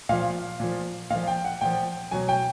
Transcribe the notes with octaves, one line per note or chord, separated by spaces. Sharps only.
A#2 F3 F5
A#2 F3
A#2 F3 F5
G5
F#5
A#2 F3 G5
B2 F#3 G#5
G5